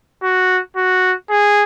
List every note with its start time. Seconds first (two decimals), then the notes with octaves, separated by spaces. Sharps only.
0.23 F#4
0.77 F#4
1.30 G#4